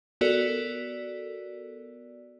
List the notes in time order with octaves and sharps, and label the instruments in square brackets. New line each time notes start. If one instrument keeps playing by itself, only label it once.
[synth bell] B3 F#4 A4 A#4 D5